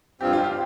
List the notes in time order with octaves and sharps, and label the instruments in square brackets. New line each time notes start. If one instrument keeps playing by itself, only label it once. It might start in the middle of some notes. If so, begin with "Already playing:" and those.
[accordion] G2 F3 C4 [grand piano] G4
[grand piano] F4
G4